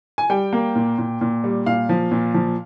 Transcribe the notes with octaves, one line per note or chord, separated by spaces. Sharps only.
G#5
G3 G5
A#3
A#2
A#2
A#2
G3
A#2 F5
F3
A#2
F3